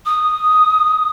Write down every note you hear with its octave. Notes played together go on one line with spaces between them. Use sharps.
D#6